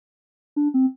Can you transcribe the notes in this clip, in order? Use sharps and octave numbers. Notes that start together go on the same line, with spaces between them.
D4
C4